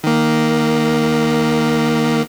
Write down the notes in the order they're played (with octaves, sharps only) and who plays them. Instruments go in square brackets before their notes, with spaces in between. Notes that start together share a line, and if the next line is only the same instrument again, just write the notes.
[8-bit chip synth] D#3 A#3